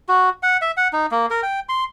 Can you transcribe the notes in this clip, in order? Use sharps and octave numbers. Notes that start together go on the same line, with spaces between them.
F#4
F#5
E5
F#5
D#4
A#3
A#4
G5
C6